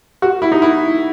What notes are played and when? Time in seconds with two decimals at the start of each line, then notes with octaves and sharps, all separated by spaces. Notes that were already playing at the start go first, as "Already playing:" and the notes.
0.22 F#4
0.42 E4
0.52 D#4
0.62 E4